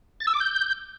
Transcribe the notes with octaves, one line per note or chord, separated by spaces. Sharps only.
A6
E6
D6
G6